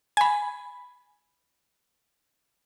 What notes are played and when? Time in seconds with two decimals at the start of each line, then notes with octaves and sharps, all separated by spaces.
0.17 G#5 B5